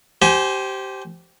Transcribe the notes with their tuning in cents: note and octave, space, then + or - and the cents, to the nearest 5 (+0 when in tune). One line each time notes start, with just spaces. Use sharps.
G4 -20 C5 +0 G#5 +25